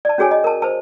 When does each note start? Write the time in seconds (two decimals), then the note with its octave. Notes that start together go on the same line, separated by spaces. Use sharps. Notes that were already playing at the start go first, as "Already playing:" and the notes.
0.05 D5 A5
0.18 C#4 F#4 G#4 C#5 G#5
0.31 D#5
0.44 A#4 A5
0.62 C5 A5